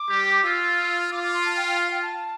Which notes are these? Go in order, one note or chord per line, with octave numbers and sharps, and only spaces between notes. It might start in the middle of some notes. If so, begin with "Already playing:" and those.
Already playing: D6
G3 G4
F4 E6
F4 D6
D6
C6
A5
G5
G5
F5
G5
A5